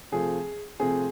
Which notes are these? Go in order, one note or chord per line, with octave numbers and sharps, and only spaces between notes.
C3 F3 A3 C4 G#4
C3 F3 A3 C4 G#4